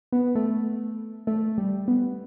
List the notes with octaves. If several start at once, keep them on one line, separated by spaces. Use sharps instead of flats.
B3
A3
A3
G3
B3